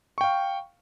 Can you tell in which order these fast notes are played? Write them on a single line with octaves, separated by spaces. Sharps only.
C#6 G5 F5